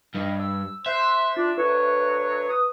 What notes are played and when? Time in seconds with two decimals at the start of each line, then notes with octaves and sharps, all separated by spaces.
0.15 G2 D#5
0.40 E6
0.86 C5 E5 F#6
1.37 D4 F4
1.58 D2 F#3 B4 C#5
2.49 D#6